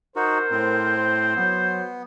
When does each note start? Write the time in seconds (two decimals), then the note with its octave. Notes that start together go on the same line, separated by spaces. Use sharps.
0.16 D#4 F#4 A#4 C5
0.51 A2 C4
1.36 F#3 B3